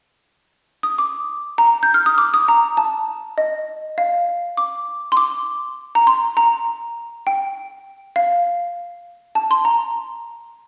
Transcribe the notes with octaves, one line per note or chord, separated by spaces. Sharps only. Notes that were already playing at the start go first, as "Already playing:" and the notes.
D#6
D6
A#5
G6
F6
D#6
D6
D#6
A#5
A5
D#5
F5
D6
C6
D6
A#5
C6
A#5
G5
F5
A5
C6
A#5